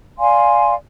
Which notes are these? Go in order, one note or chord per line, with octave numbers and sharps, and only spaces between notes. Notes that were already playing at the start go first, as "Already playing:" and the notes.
D5 F5 G#5 C6